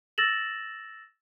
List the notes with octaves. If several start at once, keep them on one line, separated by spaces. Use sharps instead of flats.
E6 A6 A#6 E7 F#7